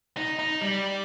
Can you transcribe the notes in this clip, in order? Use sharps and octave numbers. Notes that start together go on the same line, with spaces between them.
D#4
D#4
G3